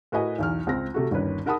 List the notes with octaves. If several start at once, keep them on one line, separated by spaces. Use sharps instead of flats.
A2 F#4 A#4 B4 D#5 G#5
B1 E2 F6
C#2 C4 A#6
C3 A3 F#4
G1 D#2 C#4 B4
D#4 A#4 F#5 A5 B5 D#6